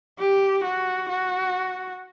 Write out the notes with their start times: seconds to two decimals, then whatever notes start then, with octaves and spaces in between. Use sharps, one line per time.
0.19 G4
0.64 F#4
1.09 F#4